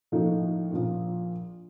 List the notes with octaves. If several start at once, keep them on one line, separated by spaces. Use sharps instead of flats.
A2 F3 A#3 D#4 A4
A#1 A#2 F3